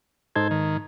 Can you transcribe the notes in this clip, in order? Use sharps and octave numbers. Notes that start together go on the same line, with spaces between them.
G#2 D#4 A4 C5 G#6
D#3